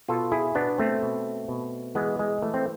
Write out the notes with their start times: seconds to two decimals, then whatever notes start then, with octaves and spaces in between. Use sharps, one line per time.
0.08 B2 F4 A4
0.32 E4 G#4
0.55 B2 B3 D4
0.78 A3 C4
1.02 B2
1.48 B2
1.95 E3 G#3 B3
2.19 G#3
2.42 E3 A3
2.54 C4